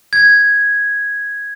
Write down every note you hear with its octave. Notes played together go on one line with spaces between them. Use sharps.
G#6